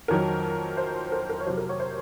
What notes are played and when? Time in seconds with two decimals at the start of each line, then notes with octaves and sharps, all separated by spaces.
0.08 F2 D#3 F#3 A#4
0.77 C5
1.12 A#4
1.30 A#4
1.40 C#5
1.46 F#3 C5
1.49 C3
1.57 A#4
1.69 C#5
1.80 C5